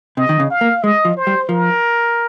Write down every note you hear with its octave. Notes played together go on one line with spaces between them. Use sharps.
C3 D#5
D#3
C#3
F5
A#3
G#3 D#5
F3
C5
G3
F3 A#4